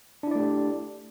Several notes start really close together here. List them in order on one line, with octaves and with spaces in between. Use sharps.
D4 E4 D5 A3 G4